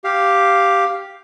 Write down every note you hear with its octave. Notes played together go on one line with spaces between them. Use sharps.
G4 F5